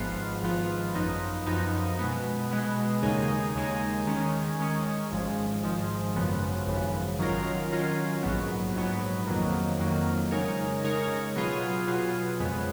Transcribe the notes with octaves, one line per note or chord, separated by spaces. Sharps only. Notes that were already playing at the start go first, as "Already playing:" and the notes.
Already playing: G#1 G#2 F3 B3 F4
G#1 G#2 F3 B3 F4
F#2 F3 B3 D#4
F#2 F3 B3 D#4
B2 G#3 B3
B2 G#3 B3
D#2 C#3 G#3 D#4 G#4
D#2 C#3 G#3 D#4 G#4
D#3 G#3 C#4
D#3 G#3 C#4
G#1 G#2 F3 G#3
G#1 G#2 F3 G#3
G#1 F#2 C#3 F3 B3
G#1 F#2 C#3 F3 B3
D#3 F#3 C#4 F4 A#4
D#3 F#3 C#4 F4 A#4
A#1 G#2 F#3 B3
A#1 G#2 F#3 B3
F2 D#3 F#3 A#3
F2 D#3 F#3 A#3
C#3 G#3 D#4 A#4 C#5
C#3 G#3 D#4 A#4 C#5
B2 F#3 B3 F4 G#4
B2 F#3 B3 F4 G#4
F2 C#3 G#3 B3